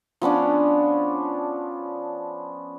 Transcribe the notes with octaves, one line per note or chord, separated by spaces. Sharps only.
F3 B3 C#4 D4